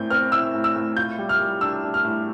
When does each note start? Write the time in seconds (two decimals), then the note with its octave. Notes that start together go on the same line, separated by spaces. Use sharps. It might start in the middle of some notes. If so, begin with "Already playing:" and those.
Already playing: A2 C4 G6
0.10 C4 F6
0.32 E4 E6
0.54 A2
0.64 E6
0.76 A2
0.97 F4 G6
1.19 G3
1.29 F6
1.41 G3
1.61 D4 E6
1.83 D4
1.94 F6
2.05 A2